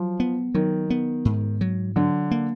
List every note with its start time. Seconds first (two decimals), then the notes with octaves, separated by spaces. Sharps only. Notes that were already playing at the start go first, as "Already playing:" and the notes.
Already playing: F3 F#3
0.20 B3
0.54 D#3 F#3
0.90 B3
1.25 G#2
1.61 F#3
1.96 D3 F#3
2.31 A#3